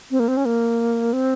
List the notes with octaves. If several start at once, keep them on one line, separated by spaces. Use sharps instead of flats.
C4
A#3
C4
C#4
A#3
C4